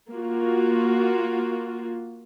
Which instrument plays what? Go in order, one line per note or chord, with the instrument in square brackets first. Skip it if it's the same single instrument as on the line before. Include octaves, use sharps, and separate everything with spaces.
[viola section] A#3 F4 F#4